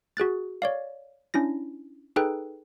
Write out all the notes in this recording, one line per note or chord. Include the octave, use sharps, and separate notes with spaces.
F#4 G#4 F#6 A6
C#5 D5 F5
C#4 D4 E4 A#6
D#4 G#4 A4 B4 G5 F#6